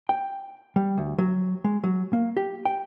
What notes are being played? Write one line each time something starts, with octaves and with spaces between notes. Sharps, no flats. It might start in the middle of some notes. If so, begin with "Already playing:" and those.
G5
G3
D2
F#3
G#3
F#3
A#3
G4
G5